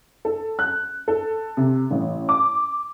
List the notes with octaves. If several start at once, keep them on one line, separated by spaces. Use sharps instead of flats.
A4
F#6
A4
C3
A1
D6